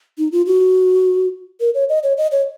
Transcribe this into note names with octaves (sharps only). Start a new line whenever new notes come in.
D#4
F4
F#4
A#4
C#5
D#5
C#5
D#5
C#5